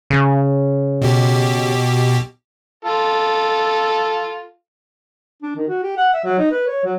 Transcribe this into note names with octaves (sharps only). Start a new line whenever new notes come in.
C#3
B2 G4
F4 A4
D4
D#3
F#4
G4
F#5
E5
F#3
D#4
B4
C#5
F#3